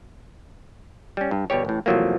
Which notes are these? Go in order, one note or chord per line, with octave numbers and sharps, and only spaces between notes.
G3 C#4
G2
G1 B2 G3 G4 C#5
A1 A2
E2 C3 F3 F#3 A3 A#3